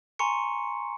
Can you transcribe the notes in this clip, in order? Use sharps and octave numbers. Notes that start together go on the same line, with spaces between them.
G#5 A#5 C6 C#6 C#7